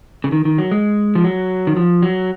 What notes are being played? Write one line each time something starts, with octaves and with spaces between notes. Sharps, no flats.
C#3
D#3
D#3
F#3
G#3
F3
F#3
D#3
F3
F#3